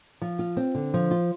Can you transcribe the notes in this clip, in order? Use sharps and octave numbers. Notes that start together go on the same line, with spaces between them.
F3
F4
C4
D3
F3
F4